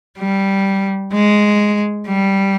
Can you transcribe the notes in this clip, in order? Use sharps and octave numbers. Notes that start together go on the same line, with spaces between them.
G3
G#3
G3